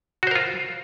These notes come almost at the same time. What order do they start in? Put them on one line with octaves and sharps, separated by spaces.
F#4 C5 A#4 F4